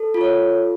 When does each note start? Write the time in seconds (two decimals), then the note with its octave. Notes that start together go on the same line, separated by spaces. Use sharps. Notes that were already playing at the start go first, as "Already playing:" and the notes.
Already playing: A4
0.14 F4
0.21 C#5